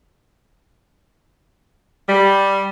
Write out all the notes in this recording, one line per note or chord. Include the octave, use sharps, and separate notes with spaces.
G3